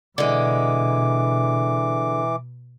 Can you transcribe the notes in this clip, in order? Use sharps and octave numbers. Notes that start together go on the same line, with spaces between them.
B2 D3 E3 G#3 D6